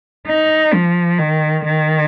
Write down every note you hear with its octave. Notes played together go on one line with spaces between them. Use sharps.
D#4
F3
D#3
D#3